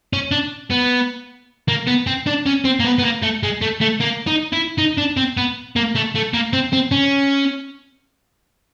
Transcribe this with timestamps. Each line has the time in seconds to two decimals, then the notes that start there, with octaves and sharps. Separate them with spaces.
0.13 C#4
0.31 D4
0.70 B3
1.68 A#3
1.87 B3
2.07 C4
2.26 D4
2.46 C#4
2.64 C4
2.80 A#3
2.85 B3
2.99 B3
3.03 A#3
3.23 A3
3.43 G#3
3.62 A3
3.81 A3
4.01 A#3
4.27 D#4
4.53 E4
4.78 D#4
4.98 D4
5.17 C4
5.37 B3
5.76 A#3
5.95 A3
6.15 A3
6.33 A#3
6.53 C4
6.73 C4
6.91 C#4